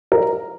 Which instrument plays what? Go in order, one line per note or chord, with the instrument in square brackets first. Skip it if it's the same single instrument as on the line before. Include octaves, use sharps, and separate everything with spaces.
[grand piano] A#4